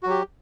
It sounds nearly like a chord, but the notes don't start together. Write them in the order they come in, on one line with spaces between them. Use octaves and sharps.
F#4 F#3 G4